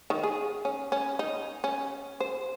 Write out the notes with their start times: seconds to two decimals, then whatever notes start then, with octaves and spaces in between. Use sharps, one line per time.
0.10 D#3
0.23 G#4
0.65 C#4
0.92 C#4
1.19 D#4
1.64 C#4
2.20 C5